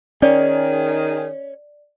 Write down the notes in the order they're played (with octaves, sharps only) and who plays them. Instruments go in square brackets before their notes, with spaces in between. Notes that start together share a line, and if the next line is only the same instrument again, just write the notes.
[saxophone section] D#3 G#4 [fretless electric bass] C#4 [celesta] D5